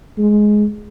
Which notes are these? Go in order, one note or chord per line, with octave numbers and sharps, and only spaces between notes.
G#3